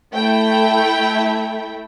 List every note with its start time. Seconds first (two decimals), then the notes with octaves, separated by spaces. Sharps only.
0.13 A3 E4 A4 G5